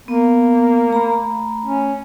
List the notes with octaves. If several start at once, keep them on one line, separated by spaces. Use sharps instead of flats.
A#3 B3
A3 A#5 B5
C#4